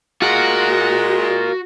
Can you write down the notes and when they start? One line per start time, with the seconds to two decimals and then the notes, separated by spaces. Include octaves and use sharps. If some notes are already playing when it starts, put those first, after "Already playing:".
0.22 G#3 F4 F#4 A#4